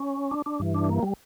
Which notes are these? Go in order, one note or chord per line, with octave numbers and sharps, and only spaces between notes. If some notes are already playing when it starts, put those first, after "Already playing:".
Already playing: C#4
D4
D4
G2 E3
D4
A#3
G3